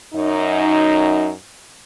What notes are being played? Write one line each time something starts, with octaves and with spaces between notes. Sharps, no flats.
F#2 D#4